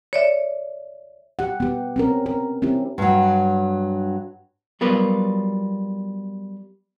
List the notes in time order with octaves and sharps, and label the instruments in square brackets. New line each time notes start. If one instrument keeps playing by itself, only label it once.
[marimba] C#5 D5 E5
[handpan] G4 F#5
B3 G4
C4 C#4 A#4
A#4
C4 C#4 E4 G4
[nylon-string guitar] G2 F#3
[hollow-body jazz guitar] F#3 G3 B3 F4 A#4 B4